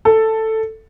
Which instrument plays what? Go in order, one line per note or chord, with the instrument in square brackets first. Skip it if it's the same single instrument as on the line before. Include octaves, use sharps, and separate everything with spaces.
[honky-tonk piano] A4